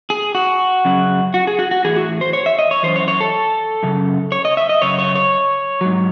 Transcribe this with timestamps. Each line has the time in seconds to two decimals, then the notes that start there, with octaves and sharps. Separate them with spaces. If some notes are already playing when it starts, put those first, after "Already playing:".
0.10 G#4
0.35 F#4
0.85 F#2 C#3 F#3
1.34 F#4
1.47 G#4
1.59 F#4
1.71 F#4
1.84 A2 E3 G#4
1.96 F#4
2.21 C5
2.33 C#5
2.46 E5
2.59 D#5
2.71 C#5
2.83 F#2 E3 C5
2.96 C#5
3.08 C#5
3.20 A4
3.83 F#2 C#3
4.32 C#5
4.45 D#5
4.57 E5
4.69 D#5
4.82 F#2 C#3 C#5
4.99 C#5
5.15 C#5
5.81 G#2 F#3